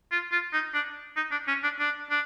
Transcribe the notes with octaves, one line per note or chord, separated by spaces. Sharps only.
F4
F4
D#4
D4
D#4
D4
C#4
D4
D4
D4